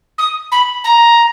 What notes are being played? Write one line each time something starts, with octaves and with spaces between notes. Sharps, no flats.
D#6
B5
A#5